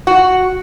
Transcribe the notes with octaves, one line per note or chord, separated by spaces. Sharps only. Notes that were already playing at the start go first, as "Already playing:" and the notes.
F#4